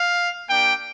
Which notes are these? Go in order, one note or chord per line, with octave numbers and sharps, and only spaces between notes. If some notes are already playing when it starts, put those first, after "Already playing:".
Already playing: F5
A#3 D4 G4 G5